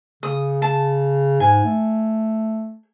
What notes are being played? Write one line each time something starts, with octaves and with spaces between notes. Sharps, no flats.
C#3 D#6
A5
G#2 G#5
A3